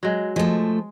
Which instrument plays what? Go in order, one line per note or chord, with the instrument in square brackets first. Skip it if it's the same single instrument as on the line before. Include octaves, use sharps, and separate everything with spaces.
[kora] F#3 G#3
[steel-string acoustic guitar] F3 A3 [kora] G#3